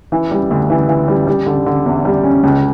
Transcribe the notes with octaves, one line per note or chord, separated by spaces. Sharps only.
E3
G3
D2
E3
E3
G3
G3
D3
D3
E2
G3
C#4
C#2